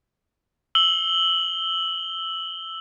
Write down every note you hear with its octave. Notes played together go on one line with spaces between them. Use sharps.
E6 F#7 G7